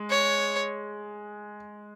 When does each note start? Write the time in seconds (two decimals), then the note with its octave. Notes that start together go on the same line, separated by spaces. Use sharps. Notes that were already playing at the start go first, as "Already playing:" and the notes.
Already playing: G#3
0.10 C#5